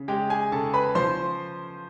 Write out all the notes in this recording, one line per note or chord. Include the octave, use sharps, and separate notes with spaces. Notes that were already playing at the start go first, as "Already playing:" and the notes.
Already playing: C#3
G#3 G4 G5
G#4 G#5
C#3 A4 A5
B4 B5
F3 C5 C6